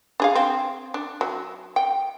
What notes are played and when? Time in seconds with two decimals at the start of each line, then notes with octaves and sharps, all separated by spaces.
0.20 D4 G#4 F5
0.35 C4
0.94 D4
1.21 F#3
1.76 G5